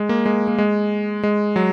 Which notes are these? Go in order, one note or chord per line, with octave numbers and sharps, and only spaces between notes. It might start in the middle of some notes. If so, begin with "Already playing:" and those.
Already playing: G#3
A#3
G#3
A#3
G#3
G#3
F#3